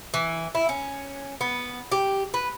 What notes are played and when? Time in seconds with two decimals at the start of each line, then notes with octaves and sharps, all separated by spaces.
0.14 E3
0.55 E4
0.69 C#4
1.41 B3
1.92 G4
2.34 B4